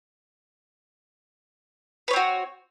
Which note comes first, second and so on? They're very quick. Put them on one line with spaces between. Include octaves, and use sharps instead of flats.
B4 C#5 C4 F#4